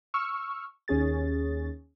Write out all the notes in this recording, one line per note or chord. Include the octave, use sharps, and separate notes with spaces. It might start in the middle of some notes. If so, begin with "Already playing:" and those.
C#6 E6 F6
D#2 C#4 G#4 A6